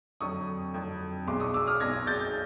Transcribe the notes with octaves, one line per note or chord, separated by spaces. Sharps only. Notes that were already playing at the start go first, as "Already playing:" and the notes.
F2 D3 F#3 C#6 D#6
F2 D3 F#3
B1 B2 G#3 C6 D6
C#6 D#6
D6 E6
D#6 F6
B1 B2 G#3 G#6 A#6
G6 A6